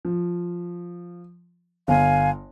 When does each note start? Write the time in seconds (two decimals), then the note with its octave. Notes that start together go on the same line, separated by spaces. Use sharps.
0.05 F3
1.88 G1 F5 G#5